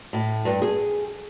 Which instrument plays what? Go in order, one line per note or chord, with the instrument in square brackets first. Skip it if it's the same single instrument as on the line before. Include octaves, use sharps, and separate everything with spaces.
[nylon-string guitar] A2
G2
G#4